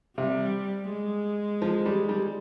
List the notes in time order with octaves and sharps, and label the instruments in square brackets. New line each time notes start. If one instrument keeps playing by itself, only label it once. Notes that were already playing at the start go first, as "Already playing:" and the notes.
[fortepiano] C3 [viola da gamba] G3
[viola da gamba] G#3
[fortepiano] F3
G3
G3